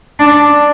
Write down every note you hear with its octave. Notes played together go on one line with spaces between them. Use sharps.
D4